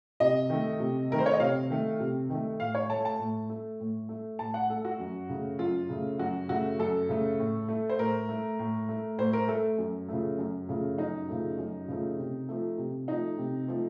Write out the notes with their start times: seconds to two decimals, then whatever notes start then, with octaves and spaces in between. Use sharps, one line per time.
0.20 C3 D#5
0.50 D#3 A3
0.80 C3
1.10 D#3 A3 A#4
1.19 C5
1.26 C#5
1.33 D#5
1.40 C3 F5
1.70 D#3 A3
2.00 C3
2.30 D#3 A3
2.60 A2 F5
2.75 C#5
2.90 A3 A5
3.05 A5
3.19 A2
3.50 A3
3.80 A2
4.09 A3
4.39 A2 A5
4.54 F#5
4.70 A3 A4
4.85 F#4
5.00 F#2
5.29 C#3 A3
5.59 F#2 F4
5.89 C#3 A3
6.19 F#2 F#4
6.48 C#3 A3 F#4
6.79 F#2 A4
7.09 C#3 A3
7.39 A2
7.68 A3
7.89 C5
7.98 A2 A#4
8.29 A3
8.59 A2
8.89 A3
9.18 A2 C5
9.33 A#4
9.48 A3 A4
9.78 F#2
10.08 C#3 F3 A3
10.38 F#2
10.69 C#3 F3 A3
10.98 F#2 D#4
11.29 C#3 F3 A3
11.58 F#2
11.88 C#3 F3 A3
12.18 C3
12.49 F3 A3
12.78 C3
13.08 F3 A3 D#4
13.38 C3
13.68 F3 A3